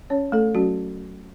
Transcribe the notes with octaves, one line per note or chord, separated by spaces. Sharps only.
C#4 C#5
A3 A4
F#3 C#4 F#4